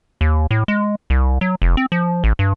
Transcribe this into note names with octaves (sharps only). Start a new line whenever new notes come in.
D#2
A2
G#3
C2
F#3
F1
C4
F3
A1
G2